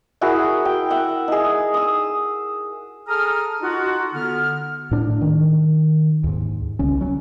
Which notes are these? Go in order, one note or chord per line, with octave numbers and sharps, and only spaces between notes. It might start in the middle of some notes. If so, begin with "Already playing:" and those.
E4 F#4 G#4 A#4
G5
E5 F#5
D#4 G#4
D#6 E6
G#4 A4 A#5 D#6 F6
D#4 F4 F#4
D3 B3 F6
A2 D4
D#3
D#2 G#2
C2 C#3 C#4
F#3 C#4